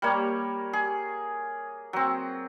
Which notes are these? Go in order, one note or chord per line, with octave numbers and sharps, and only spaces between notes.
G3 A#3 C#5
G#4
F#3 C4